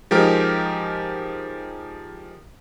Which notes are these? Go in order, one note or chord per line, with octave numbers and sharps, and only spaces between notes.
F3 G#3 D#4 G4 A#4